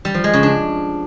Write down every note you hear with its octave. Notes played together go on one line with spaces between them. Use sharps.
G3
F3
G#3
C#3
D4